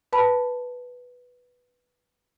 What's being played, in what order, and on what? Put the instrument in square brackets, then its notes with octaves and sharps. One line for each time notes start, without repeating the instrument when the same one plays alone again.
[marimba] B4 A5 B5